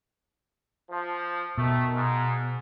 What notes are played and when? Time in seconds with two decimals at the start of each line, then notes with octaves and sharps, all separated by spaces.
0.91 F3
1.58 B2 D#3 A3
1.94 G#2